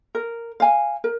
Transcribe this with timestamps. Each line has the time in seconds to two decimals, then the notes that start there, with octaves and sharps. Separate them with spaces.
0.15 A#4
0.60 F5 G#5
1.04 A#4